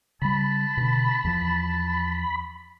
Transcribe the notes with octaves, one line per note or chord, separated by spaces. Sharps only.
C#3 G3 A5 B5
B2 D3
E2 F3